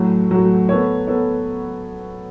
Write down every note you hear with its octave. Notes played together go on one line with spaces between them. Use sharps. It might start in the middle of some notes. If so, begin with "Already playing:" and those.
Already playing: A2 F#3 A3 F#4
A2 F#3 A3 F#4
B3 A4 C#5
B3 A4 C#5